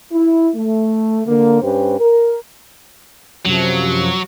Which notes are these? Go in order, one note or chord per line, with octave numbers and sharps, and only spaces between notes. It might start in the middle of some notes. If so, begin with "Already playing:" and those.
E4
A3
D3 A#3
G2 C#4 G4 B4 C5
A#4
F#2 C3 F3 F#3